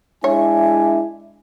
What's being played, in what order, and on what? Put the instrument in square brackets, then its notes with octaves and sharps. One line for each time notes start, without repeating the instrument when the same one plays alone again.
[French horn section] G#3 D4 E4 [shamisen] C#5 [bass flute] E5 [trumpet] G#5